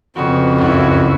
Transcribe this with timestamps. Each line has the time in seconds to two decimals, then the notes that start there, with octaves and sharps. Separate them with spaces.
0.16 F2 C#3 B3 F#4
0.58 C#2 F#2 E4 F#4